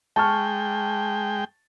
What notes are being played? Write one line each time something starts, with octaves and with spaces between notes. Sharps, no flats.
G#3 G5 A5 C#6 F6